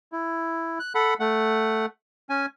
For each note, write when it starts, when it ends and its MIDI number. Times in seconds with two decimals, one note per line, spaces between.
0.12 0.79 64
0.80 0.93 90
0.95 1.14 69
0.95 1.14 78
0.95 1.14 83
1.20 1.86 57
1.20 1.86 78
2.30 2.46 61
2.30 2.46 80